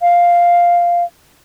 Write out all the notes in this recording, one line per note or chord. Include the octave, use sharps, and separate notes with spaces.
F5